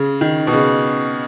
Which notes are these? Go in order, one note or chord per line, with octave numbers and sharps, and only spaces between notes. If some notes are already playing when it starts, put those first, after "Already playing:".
Already playing: C#3
D#3
B2
C#3